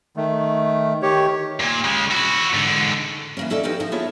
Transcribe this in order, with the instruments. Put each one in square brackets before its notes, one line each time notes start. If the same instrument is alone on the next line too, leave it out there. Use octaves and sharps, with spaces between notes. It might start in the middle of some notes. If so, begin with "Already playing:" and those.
[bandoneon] D#3 A3
D#3 G4 C#5
[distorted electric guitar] A#2
C#3 G#3
E4 F#4
G#2 D3
[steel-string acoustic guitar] E3 A#3 C#4
C#4 E4 A4 A#4 D5 D#5
F3 C#4 D#4 F#4 G4 B4
D#3 F3 D#4 E4
A3 B3 E4 F4 G#4 C#5